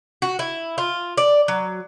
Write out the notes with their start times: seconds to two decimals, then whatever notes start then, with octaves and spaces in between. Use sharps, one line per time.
0.22 F#4
0.39 E4
0.78 F4
1.17 D5
1.48 F#3